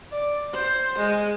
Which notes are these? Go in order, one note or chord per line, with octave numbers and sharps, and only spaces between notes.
D5
C5
G#3